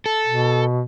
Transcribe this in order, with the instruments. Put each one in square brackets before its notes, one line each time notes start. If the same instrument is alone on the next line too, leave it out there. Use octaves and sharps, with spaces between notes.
[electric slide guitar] A4
[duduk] B2